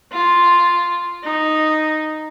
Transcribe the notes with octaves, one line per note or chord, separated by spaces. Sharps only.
F4
D#4